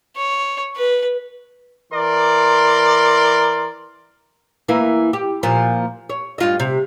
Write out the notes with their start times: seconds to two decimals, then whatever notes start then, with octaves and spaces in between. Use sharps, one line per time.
0.17 C#5
0.76 B4
1.93 E3 A#4 D5 C6
4.68 E3 A#3 E4
5.13 G4
5.43 A#2 F3
6.10 C#5
6.38 G2 F4 D#5
6.60 C3